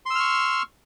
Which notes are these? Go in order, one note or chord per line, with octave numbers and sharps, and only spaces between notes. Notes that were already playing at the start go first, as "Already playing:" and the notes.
C6 C#6 E6 F6